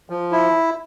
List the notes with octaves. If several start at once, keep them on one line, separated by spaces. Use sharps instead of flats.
F3
E4